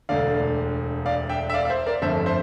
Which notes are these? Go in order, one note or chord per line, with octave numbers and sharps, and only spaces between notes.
E1 D2 D3 D5 F5
D5 F5
E5 G5
E5
D5 F5
F5
C5 E5
A#4 D5
G1 F2 D3 A3 C5 E5
C5 E5